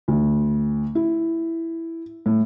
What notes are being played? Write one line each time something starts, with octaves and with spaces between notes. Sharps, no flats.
D2
E4
A2